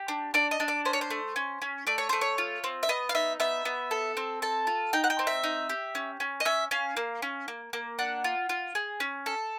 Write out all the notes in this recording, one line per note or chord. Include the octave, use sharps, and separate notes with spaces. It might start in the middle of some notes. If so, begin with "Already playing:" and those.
Already playing: G4
D4
D4 D5
D#5
D4
D5
C#4 C5
C#5
C5
A3
C#4
C#4
A3 D5
C#5
A3 C5
C#5
F4
C4
E5
B3 D#5
F5
D#4 E5
B3 E5
B3
A4
C4
A4 A5
F4
D#4 G5
F#5
G5
C4
E5
D#4
G4
C#4
C#4
D#5
C#4 E5
C#4 F5
A#3
C#4
A#3
A#3
D4 F#5
F4
F4
G#4
C#4
A4